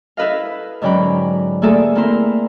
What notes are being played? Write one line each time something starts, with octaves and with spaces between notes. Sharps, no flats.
E4 A4 B4 D#5 F5
G#2 D3 F#3 C#4 G5 B5
A3 A#3 G#4 A4 D5
A#3 C4 E4 A#4 C6